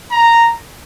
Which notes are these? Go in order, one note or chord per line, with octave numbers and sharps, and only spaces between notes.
A#5